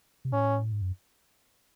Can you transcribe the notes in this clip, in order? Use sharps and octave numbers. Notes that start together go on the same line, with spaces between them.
C3
A2 C#4
G#2
F#2